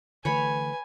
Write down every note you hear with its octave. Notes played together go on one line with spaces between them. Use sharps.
D3 E3 A3 B4 C#5 G#5 B5